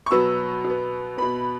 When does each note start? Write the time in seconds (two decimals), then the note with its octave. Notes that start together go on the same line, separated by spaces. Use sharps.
0.06 C#6
0.11 B2 F#3 B3 E6
0.64 B2
0.70 B3
1.17 B2 B3 B5